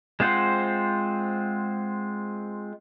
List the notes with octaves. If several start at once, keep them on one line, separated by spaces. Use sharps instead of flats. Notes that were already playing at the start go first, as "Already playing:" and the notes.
G#3 C4 F4 C5 F#5